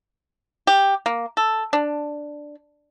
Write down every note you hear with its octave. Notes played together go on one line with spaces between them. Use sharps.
G4
A#3
A4
D4